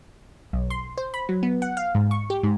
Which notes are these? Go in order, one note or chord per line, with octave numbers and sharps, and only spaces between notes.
B1
C6
C5
B5
F#3
B3
F#5
F5
G#2
C#6
G4
G#2